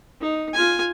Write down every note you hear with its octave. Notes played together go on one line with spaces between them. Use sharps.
D#4
F4 G#5